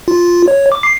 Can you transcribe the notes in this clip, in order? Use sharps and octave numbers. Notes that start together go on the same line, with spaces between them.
F4
C#5
D6
C7